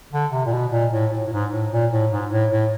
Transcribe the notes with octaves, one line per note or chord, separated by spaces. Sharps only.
D3
C3
A#2
B2
A#2
A2
A2
A2
G#2
A2
A#2
A2
G#2
A2
A2